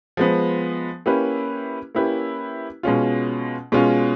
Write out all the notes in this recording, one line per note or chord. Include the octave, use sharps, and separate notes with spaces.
F3 G#3 B3
A#3 C#4 E4 G4 B4
A#3 C#4 E4 G4 B4
B2 G#3 C#4 F4
B2 G#3 C#4 F4